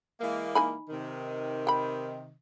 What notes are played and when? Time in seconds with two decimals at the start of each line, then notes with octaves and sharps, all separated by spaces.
0.21 E3 G#3 A#3
0.55 D#4 G#5 B5
0.89 C3 D#3
1.67 G5 B5